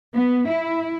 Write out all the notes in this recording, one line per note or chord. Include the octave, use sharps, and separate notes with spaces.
B3
E4